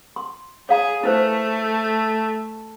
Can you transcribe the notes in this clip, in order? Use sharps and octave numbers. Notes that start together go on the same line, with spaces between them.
C6
G#4 C#5 F5 A#5
A3 E4 B4 C5